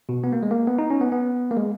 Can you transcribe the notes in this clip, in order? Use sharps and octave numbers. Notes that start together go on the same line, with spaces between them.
B2
B3
A#3
G#3
A#3
B3
D#4
C#4
B3
B3
A#3
G#3